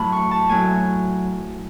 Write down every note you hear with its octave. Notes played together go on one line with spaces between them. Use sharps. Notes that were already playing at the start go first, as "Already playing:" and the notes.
Already playing: A2 F#3 A3 A5 B5
C#6
A5
A2 F#3 A3 G#5